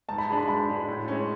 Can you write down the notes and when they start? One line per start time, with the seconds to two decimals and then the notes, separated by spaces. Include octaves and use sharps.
0.08 G#2 A5
0.18 B5
0.29 G#3 D4 A5
0.38 B5
0.48 G#2 B5
0.69 G#3 D4
0.88 A2
1.08 G#3 C#4